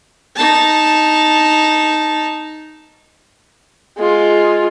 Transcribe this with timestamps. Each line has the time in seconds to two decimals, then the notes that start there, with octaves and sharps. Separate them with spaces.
0.36 D#4 A5
3.97 G#3 F4